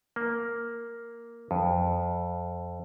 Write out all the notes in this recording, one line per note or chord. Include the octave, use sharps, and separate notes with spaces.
A#3
F2